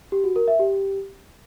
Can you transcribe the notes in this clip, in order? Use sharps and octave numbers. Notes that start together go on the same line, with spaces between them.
G4
F#4
A#4
E5
G4